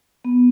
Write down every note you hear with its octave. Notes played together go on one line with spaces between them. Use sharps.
B3